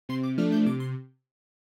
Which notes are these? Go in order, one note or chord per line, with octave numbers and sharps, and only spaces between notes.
C3 C6
D6
F3 A3 D4 F6
G6
C3 D6
C6